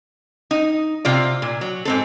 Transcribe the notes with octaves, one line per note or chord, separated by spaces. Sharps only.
D#4
C3 F4 D5
A#2
F#3
G#2 C4 A4